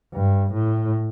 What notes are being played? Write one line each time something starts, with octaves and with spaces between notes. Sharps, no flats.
G2
A2